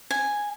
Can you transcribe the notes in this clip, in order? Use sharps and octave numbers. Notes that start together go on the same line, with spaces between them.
G#5